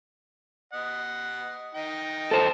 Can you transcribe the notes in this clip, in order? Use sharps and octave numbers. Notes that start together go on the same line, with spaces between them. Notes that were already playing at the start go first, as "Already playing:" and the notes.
D#5 F#5
D#4 G5
A4 C5 A5